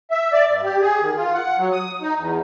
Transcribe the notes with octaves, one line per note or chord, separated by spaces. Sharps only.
E5
D5
G2
G4
G#4
D#3
F4
F#5
F#3
D#6
D#4
E2